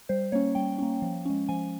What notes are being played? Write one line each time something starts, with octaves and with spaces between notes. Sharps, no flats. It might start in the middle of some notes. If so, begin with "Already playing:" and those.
G3 C5
A#3 C#4 C#5
G3 G5
A#3 C#4
F3
G#3 C#4
F3 G#5